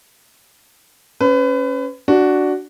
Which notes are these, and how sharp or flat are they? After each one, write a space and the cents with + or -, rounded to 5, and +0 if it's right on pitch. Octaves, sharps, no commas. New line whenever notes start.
C#4 -5 B4 +30
D4 +0 F#4 +5